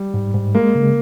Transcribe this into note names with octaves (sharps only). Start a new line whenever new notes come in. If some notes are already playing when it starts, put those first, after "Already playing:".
Already playing: G3
G#2
G#2
G#3 A#3
C#3